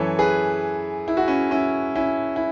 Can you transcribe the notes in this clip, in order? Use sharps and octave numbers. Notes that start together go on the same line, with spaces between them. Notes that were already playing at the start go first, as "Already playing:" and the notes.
Already playing: F#2 E3 A4 C#5
G#4 B4
E4
F#4
C#4 E4
C#4 E4
C#4 E4
E4